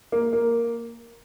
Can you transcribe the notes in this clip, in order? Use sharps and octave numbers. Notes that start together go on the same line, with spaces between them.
A#3
A#3